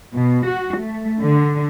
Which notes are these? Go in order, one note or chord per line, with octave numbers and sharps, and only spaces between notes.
B2
F#4
A3
D3